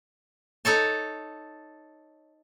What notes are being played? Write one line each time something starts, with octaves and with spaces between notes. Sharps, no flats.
D#4 A4 C#5 A5